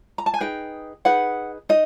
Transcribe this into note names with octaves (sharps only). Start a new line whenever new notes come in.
A#5
A5
G#5
D#4 G#4 B4 G5
D#4 G#4 B4 F#5
D#4 D#5